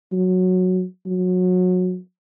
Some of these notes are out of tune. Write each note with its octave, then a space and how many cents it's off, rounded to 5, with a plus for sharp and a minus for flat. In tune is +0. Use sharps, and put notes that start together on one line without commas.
F#3 -10
F#3 -25